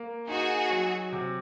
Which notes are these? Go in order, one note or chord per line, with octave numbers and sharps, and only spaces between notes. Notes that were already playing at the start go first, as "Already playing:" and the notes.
Already playing: A#3
D#4 F#4 G#4
F#3
C3